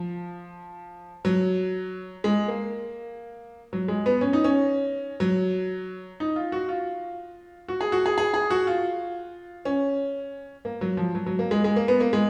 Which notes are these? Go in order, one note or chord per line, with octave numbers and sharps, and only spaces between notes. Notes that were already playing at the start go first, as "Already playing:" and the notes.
Already playing: F3
F#3
G#3
A#3
F#3
G#3
B3
C#4
D#4
C#4
F#3
D#4
F4
F#4
F4
F#4
G#4
F#4
G#4
G#4
G#4
F#4
F4
C#4
A#3
F#3
F3
F#3
F#3
A#3
G#3
G#3
A#3
B3
A#3
G#3